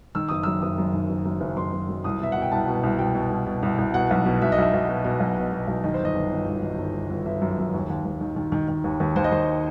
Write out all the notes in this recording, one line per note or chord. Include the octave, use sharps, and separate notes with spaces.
D#3 E6
F#1 D#6
F#2 E6
F#1 D#6
F#2
D#3
F#1
F#2
F#1
F#1 C6
F#1
F#2
C2 D#6
B2 E5
B2 F#5
G5
C2 A5
B2
C2
B2 G5
B2
C2
B2
C2
C2
B2 F#5
B1
B2
B1 E5
D#5
B1 E5
B1
B2
B2
B1
B2
B2
B1
D#3 D#5
C5
G1 D#5
G1
G1
D#3
D#3
G1
D#3
G1
G1 E5
F#2
F#2
D#2
D#2
D#2
D#3
D#3
D#3
D#3
D#2
D#2
D#2 C5
D#5
D#2 C5